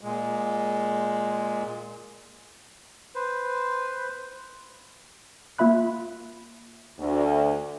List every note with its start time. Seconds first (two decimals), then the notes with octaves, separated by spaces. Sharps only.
0.01 A#2 G#3
3.15 B4 C5
5.58 A#3 F4 E5 B5 F#6
6.99 D2